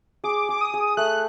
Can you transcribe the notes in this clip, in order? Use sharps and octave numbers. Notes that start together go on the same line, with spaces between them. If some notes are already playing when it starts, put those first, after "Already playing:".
G#4 D6
G#4 D6
D#6
G#4
A3 F#6